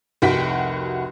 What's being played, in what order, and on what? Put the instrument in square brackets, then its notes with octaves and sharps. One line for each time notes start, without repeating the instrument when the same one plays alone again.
[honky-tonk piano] F1 C2 F#4 G5 B6